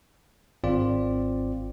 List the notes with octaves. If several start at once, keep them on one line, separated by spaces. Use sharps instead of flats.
G#1 C4 F4 D5